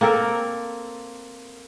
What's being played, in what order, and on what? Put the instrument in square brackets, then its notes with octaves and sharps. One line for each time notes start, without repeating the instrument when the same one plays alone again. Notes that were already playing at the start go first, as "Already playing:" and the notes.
[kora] A#3 C4 A4 A#4